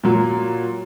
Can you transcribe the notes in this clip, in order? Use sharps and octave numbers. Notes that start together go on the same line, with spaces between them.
A#2 F#3